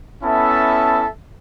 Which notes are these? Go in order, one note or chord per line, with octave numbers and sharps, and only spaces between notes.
B3 C#4 E4 A4 E5 A5